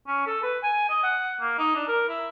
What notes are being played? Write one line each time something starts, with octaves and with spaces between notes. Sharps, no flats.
C#4
A4
B4
G#5
D#5
F#5
A#3
D#4
D4
A#4
E4